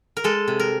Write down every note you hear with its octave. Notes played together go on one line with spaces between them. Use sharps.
A#4
G#3 A4
C3
A#4